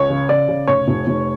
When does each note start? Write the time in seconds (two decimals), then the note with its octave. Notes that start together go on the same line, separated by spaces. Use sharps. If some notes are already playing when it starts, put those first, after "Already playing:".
Already playing: C#2 C#5
0.10 C#3
0.29 C#3 D5
0.48 C#3
0.67 F1 C#5
0.88 F1
1.07 F1